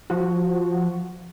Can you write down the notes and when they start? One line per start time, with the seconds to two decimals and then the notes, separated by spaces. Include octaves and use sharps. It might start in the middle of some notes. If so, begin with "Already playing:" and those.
0.10 F3 F#4